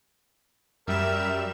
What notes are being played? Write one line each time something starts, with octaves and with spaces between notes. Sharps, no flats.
F#2 G3 A#4 E5 E7